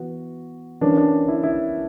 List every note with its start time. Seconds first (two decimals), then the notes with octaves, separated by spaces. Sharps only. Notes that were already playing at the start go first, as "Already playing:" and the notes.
Already playing: E3 B3 F#4
0.81 E3 G3 A#3 C#4 D4
0.97 D4
1.28 E4
1.43 E4